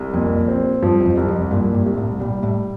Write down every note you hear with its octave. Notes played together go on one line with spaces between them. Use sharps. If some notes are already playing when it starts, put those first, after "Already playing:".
Already playing: C2
F2 A#2
C4
G2 F3
G2
F2
C2
F2
G2 A#2
G2
C2
A2
A#2 G3
A2